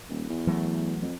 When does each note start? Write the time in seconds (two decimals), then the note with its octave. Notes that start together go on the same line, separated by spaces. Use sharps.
0.09 D#1
0.29 E2
0.47 E3 F#3 A3
1.02 F2